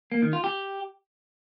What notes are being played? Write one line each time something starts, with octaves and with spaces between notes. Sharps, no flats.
A#3
D#3
F4
G4